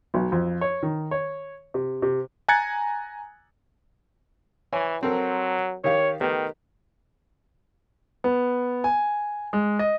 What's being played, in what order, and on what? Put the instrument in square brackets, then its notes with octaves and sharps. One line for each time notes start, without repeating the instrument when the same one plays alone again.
[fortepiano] B1
F2
C#5
D#3
C#5
C3
C3
[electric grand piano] G#5 A#5 F#6 G#6 A6 C#7
[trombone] E3 [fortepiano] C#5 G#5
[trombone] F#3 [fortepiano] C4 A4 A#4
[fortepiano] D#3 G4 F5 [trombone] C#5
[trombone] D#3 [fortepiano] A3 B3 G4
[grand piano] B3
G#5
G#3
D#5